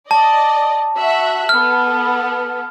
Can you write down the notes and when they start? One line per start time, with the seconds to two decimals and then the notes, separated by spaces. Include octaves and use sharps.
0.11 D5 D#5 A5
0.97 F#4 E5 F#6
1.49 B3 A4 F6